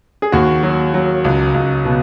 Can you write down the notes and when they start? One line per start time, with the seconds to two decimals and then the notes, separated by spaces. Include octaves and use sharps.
0.22 G#4
0.32 D#2 F#4
0.63 F#3
0.94 F#3
1.25 C#2
1.54 C#2
1.85 B2